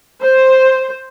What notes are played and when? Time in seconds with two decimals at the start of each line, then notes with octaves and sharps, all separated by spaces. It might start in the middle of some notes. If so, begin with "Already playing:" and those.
0.21 C5